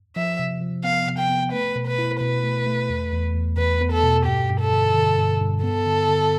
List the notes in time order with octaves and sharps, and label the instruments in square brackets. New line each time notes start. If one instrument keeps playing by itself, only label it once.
[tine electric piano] F3 [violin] E5
[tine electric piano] C3
F3
[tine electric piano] B3 [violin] F5
[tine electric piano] C3
[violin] G5
[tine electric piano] B3
[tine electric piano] A3 [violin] B4
[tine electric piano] B2
[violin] B4
[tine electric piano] E4
[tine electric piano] B2 [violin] B4
[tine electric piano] A3
A3
E2
E2
E2
[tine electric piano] E2 [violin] B4
[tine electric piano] B3
[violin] A4
[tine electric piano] B2
[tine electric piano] G2 [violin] G4
[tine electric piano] G2
[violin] A4
[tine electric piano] D3
D3
G2
G2
[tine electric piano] B3 [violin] A4
[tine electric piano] D3
D3